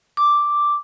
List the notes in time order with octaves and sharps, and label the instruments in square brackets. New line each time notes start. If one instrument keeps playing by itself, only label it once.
[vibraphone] D6